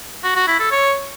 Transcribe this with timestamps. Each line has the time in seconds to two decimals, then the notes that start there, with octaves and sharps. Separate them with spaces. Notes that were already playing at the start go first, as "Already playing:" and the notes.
0.24 F#4
0.36 F#4
0.47 E4
0.59 A4
0.71 C#5